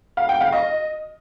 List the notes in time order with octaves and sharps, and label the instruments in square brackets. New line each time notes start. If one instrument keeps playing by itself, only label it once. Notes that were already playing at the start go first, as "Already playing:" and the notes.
[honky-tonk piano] F5
G5
F5
D#5